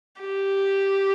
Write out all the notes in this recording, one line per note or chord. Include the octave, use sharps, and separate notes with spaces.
G4